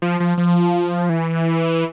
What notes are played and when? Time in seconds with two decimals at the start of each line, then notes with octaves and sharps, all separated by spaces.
0.02 F3
0.20 F3
0.37 F3
1.09 E3